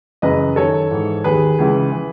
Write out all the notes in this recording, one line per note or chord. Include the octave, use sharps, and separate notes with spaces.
F#2 C#3 E3 B4 D#5
F#2 D#3 A4 C#5
G#2 E3
D#2 D#3 G#4 B4
C#2 C#3 E3
E3